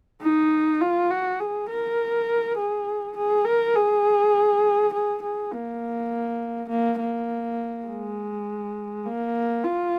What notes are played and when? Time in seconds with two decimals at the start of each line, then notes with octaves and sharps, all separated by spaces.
0.22 D#4
0.81 F4
1.11 F#4
1.40 G#4
1.70 A#4
2.57 G#4
3.17 G#4
3.45 A#4
3.75 G#4
4.93 G#4
5.22 G#4
5.52 A#3
6.69 A#3
7.00 A#3
7.87 G#3
9.06 A#3
9.64 F4